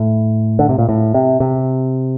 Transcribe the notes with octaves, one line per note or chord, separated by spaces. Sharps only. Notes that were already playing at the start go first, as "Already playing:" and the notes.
Already playing: A2
D3
C3
A#2
A2
C3
C3